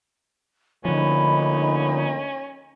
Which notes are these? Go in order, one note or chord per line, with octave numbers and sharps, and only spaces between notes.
D2 D3 F3 A#3 C#4 D#4 B5